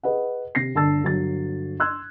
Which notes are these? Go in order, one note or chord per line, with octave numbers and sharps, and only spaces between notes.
G#4 B4 D#5 F#5
C3 A#6 C7
G1 D3 A5 E6 A6
G1 F#3 A6
C6 E6 F#6 G#6